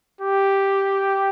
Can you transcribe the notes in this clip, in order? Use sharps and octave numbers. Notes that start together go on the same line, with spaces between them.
G4